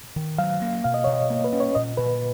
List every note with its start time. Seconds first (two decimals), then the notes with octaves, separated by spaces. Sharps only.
0.16 D#3
0.38 F#3 F5
0.62 A#3
0.84 B2 F5
0.94 D#5
1.04 B2 C#5
1.13 D#5
1.30 A#3
1.44 B4
1.52 C#4
1.60 C#5
1.75 A#2 D#5
1.97 A#2 B4